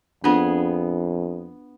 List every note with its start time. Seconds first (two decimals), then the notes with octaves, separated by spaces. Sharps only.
0.24 F2 B3 D4 F4 G#4